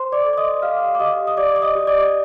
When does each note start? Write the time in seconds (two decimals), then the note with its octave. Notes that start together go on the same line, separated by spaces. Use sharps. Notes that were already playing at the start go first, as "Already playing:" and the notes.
Already playing: C5 C6
0.12 D5 D6
0.24 A4
0.33 D6
0.37 D#5 D#6
0.62 G4 F5 F6
0.95 D6
1.00 G4 D#5 D#6
1.27 D#6
1.37 G4 D5 D6
1.56 D6
1.62 D#5 D#6
1.75 G4
1.87 D5 D6